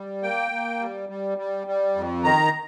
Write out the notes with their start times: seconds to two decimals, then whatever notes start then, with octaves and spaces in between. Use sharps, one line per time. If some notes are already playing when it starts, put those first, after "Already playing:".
Already playing: G3
0.23 A#3 G5
0.51 A#3
0.80 G3
1.09 G3
1.38 G3
1.67 G3
1.96 F2
2.24 D#3 A#5